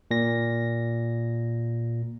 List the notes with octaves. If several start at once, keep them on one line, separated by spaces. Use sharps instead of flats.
A#2 A#6